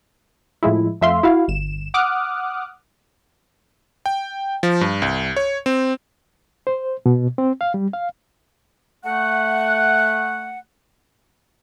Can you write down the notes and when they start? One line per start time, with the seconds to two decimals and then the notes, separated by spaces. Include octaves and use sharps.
0.63 A2 F3 G#3 E4
1.01 F2 A3 E5 F5 C6
1.23 E4 F#4 F5
1.48 G1 E7
1.94 F#5 D6 D#6 F6 F#6
4.06 G5
4.63 F3
4.81 G2
5.02 C2
5.36 C#5
5.66 C4
6.67 C5
7.06 B2
7.38 C4
7.61 F5
7.74 G3
7.93 F5
9.05 A3 F#5